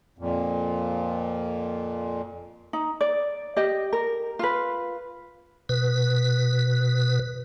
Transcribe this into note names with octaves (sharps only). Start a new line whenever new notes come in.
F2 A#2
D#4
D5
G4 D#5
A#4
F4 B4
B2 B4